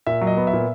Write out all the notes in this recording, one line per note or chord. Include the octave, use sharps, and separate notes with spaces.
A#2 E5
F#3
D#5
B3
E5
A#2